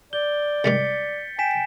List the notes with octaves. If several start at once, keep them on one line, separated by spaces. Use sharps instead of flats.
D5 G6 G7
C2 G#2 D#3 A6 B6 C#7
G5 G#5 B6 E7